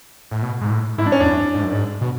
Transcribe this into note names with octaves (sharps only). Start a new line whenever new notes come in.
A2
B2
G#2
A2
G#2 E4
D4
C#4
E2 D4
F#2
G#2
F#2
G#2
B2